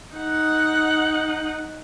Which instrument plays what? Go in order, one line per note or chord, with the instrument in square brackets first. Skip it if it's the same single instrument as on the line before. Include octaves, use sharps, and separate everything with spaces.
[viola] D#4 F#5